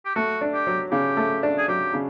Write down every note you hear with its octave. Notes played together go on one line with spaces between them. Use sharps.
G4
A3 F#4
D4
G4
F#3
C#3 G4
A3
D4
G#4
F#3 G4
C#3